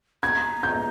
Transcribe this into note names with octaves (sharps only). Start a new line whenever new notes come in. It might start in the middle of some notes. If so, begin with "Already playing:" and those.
A#5 B5 G#6
G6